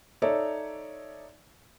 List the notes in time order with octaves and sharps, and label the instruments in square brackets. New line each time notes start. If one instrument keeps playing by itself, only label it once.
[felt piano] D#4 A4 C#5 D5 E5